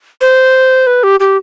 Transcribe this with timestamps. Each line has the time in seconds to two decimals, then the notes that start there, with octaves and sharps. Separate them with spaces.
0.21 C5
0.87 B4
1.03 G4
1.20 G4